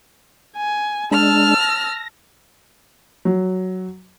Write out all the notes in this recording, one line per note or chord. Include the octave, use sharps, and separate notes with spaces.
G#5
G#3 D4 A5 E6 F6
A#6
F#3